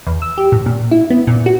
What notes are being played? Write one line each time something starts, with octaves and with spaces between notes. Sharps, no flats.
E2
E6
G4
A2
A#2
E4
B3
A#2
F#4